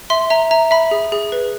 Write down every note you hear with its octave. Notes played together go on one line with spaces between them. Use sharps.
E5 C6
E5 A#5
E5 A#5
E5 B5
G#4
G#4
B4